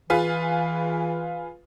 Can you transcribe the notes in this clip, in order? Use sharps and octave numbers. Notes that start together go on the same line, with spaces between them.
E3 F4 G#4 B4